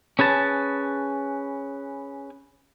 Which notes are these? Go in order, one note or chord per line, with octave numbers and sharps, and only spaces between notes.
C#4 G#4 B4 A5